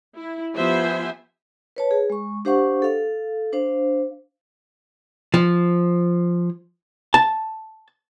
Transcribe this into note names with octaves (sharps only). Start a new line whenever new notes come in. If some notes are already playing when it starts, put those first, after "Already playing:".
E4
F3 B3 G4 C5 E5 G#5
B4 C#5 A5
G#4
G#3 C#6
D4 G4 C5 F5 F#5 C#6
A4 F5
D4 C5 F5
F3
A5